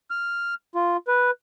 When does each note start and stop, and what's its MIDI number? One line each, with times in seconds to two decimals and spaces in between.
0.11 0.54 89
0.76 0.97 65
1.08 1.31 71